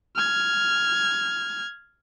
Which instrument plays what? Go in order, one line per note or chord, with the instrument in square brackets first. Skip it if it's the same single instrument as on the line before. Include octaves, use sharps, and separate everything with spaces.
[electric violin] F6 G#6